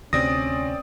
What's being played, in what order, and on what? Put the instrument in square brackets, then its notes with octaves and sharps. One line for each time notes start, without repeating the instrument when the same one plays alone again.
[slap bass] D2 C3 [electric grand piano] C4 D5 D#6 [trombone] C#4 [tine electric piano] A#6